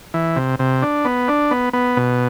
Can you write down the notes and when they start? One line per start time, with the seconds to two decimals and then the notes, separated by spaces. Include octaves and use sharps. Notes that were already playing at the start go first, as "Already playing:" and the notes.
0.14 E3
0.36 C3
0.59 C3
0.82 D4
1.05 B3
1.28 D4
1.51 B3
1.73 B3
1.97 B2